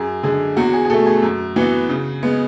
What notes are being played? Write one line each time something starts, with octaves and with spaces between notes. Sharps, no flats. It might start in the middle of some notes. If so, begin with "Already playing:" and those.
Already playing: F#2 G#4
D3 G#3 G#4
E2 F#4
G#4
G#4
B2 A3 A4
G#4
F#2
E3 B3 F#4
C#3
G#3 B3